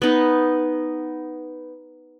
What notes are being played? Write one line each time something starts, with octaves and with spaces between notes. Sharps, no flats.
B3 D#4